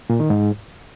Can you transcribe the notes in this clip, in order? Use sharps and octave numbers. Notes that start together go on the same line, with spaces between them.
A#2
D#3
G#2